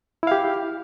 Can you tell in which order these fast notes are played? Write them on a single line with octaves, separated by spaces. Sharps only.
E4 F5 G4